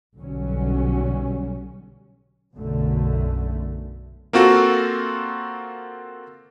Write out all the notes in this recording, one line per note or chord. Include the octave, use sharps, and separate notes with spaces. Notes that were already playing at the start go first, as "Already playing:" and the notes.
B1 D3 F#3 G3 C#4
B1 F#2 D3 A3
A#3 C4 F4 F#4 A4